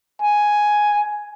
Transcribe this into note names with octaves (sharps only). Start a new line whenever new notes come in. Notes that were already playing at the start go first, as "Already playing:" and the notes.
G#5